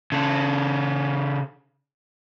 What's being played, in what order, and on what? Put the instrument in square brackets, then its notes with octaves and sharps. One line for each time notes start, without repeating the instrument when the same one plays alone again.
[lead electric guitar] C#3 A4